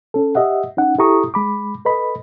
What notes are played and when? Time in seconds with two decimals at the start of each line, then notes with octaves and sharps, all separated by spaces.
0.14 C#4 A4
0.35 G4 D#5 E5 F#5
0.77 C#4 D#4 F#5
0.99 E4 G4 A4 A#5 C#6 D#6
1.34 G#3 B5 D6
1.85 A4 B4 D#5 B5